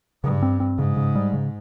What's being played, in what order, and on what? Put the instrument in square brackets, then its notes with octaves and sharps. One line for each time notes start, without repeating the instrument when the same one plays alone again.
[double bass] G2 [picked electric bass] C#3
[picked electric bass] C4
C4
[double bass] G#2 [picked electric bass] C#3
[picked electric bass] C#3
G3
C#3